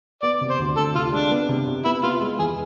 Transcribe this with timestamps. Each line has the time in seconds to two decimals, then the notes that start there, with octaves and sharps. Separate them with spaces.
0.22 B3 D5
0.41 C3
0.50 C5
0.59 D2
0.77 D2 A4
0.95 C3 F4
1.13 G#3 D4
1.31 B3
1.49 C3
1.67 C3
1.85 B3 E4
2.03 B3 F4
2.21 G#3
2.39 E2 G#4